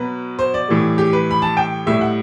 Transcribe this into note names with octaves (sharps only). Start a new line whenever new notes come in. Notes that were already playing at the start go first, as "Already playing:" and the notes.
Already playing: B2 F#3 B4
C5
D5
A2 E3 G3
G4
B4
B5
A5
G5
A2 G3 E5
F#5